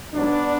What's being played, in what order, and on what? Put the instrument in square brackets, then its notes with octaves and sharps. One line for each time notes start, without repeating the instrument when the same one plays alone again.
[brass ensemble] A1 G#2 F#3 B3 D4